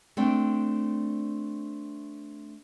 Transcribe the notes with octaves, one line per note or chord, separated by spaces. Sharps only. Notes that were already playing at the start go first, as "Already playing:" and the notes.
A3 C4 D4 G5